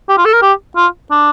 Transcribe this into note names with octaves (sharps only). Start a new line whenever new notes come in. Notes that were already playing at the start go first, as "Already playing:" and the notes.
G4
F4
A4
A#4
G4
F4
D4